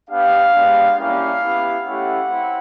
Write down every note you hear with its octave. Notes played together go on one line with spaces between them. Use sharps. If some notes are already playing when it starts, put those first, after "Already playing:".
B3 D4 G4 F5
G#3 B3 D4 G4
G3 A#3 C#4 E4 G4 F5
B3 E4 G4
A3 C#4 E4 G4 F#5
C4 E4